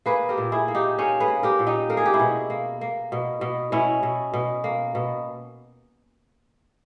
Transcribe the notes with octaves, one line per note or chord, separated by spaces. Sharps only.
A#3 G#4 B4
G4 A#4
A#2
E4 G#4
A#3
D#4 G4
A#3 C#4
G#4 B4
A#3
G4 A#4
A#2
D#4 G4
A#3 A#4
G#4
G4
E4 G#4
B2
A#3
A#3
B2
B2
B2 C#4 E4
B2
B2
A#3
B2